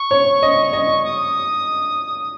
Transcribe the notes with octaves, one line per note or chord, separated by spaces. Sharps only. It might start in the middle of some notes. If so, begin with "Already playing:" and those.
Already playing: C#6
C#5
D#5
D#5
D#6